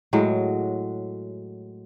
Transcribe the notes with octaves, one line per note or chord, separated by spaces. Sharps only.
A2 F#3 G#3